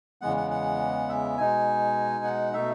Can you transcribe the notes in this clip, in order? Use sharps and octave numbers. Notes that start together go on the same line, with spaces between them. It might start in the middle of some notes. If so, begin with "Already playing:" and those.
E2 C#3 E3 G#3 B3 F#5
F#5
F#5
E5
B2 G#3 D#4 G#5
F#5
B2 A3 D#4 E5